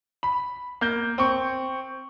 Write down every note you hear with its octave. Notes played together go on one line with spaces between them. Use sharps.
B5
A#3 G6
C4 C#6